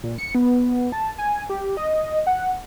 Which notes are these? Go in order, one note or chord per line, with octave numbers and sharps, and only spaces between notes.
A#2
C#7
B3
A5
G#5
G4
D#5
F#5